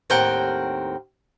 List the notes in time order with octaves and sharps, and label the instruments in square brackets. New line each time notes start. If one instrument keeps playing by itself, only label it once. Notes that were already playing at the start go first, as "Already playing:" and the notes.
[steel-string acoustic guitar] D#2 A2 C4 A#4 F#5 G5